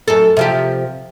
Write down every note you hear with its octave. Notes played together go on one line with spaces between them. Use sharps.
F#2 A4
C3 F3 G4